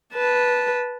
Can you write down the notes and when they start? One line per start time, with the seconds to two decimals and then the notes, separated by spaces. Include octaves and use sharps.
0.14 B4 A5